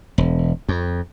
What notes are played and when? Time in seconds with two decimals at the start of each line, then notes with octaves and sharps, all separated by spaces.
0.18 E1
0.69 F2